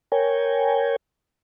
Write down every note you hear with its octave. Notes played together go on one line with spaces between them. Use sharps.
A#4 C#5 G5 G#5